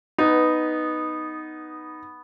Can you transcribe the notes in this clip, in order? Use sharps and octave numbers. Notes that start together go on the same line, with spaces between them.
B3 D#4